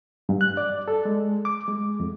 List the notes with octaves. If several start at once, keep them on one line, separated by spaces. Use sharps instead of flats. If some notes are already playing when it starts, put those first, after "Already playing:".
G2
F#6
D5
A4
G#3
D6
G#3
F2